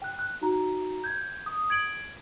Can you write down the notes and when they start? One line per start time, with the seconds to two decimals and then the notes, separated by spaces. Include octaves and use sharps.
0.02 G5 F#6
0.19 F#6
0.42 D#4 F#4 A#5
1.04 G6 G#6
1.46 D#6
1.70 G#6 D7 F#7